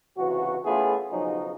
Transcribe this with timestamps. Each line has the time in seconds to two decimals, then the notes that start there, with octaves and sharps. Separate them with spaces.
0.17 C#2 C3 E3 F#4
0.65 A3 B3 C#4 E4 F4 G#4
1.11 B1 C#3 F3 F#3 D#4